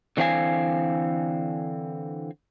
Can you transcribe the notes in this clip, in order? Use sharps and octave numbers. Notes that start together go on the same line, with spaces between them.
D3 E3 C4 E4 F5 G#5